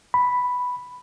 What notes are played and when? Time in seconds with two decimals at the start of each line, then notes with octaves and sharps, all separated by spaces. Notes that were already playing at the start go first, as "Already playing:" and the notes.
0.14 B5